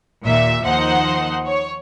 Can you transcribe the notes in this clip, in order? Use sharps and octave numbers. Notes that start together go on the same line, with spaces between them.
D#2 A#2 E5
D#2 F3 D#4 C5 F#5
C#5